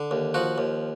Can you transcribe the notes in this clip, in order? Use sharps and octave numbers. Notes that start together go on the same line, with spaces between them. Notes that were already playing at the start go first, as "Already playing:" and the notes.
Already playing: D3
D#2
F3 F#4
D#2